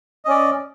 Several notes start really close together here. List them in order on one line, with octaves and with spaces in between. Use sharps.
D#5 C#4 D5